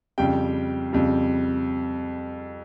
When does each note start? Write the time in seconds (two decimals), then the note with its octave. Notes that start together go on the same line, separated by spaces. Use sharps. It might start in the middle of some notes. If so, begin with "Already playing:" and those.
0.18 F2 C#3 G3 G5
0.93 F2 C#3 G3